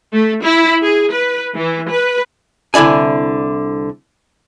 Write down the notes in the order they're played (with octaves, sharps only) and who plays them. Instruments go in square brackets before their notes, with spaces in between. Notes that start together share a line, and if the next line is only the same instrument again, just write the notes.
[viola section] A3
E4
G#4
B4
E3
B4
[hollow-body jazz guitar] C2 D3 E4 D5 G#5